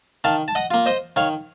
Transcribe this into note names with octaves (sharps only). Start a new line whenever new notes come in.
D#3 F5 A5
A5
D#5 F#5
A#3 F4
C5 D#5
D#3 C#5 F5